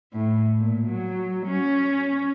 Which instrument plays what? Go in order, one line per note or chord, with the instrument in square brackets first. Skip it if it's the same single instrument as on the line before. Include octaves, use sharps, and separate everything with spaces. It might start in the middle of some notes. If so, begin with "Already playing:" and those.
[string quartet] A2
A#2
F#3
C#4